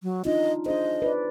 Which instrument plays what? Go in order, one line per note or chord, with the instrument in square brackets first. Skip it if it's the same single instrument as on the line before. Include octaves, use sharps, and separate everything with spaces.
[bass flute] F#3
[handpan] D4 D#4 F4 [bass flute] D#5
[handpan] D4 G#4 C5 [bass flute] D#5
[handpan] B4 D5